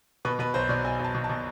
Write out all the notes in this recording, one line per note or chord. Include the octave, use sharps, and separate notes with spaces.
B2 B4
B2 B4
B1 C5
B2 D5
B1 G#5
B1 A5
B2
A5
B2